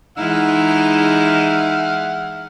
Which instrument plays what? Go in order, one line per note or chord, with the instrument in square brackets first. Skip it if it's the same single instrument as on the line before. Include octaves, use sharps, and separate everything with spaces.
[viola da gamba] E3 G#3 E4 [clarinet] D#4 [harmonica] F#5 F6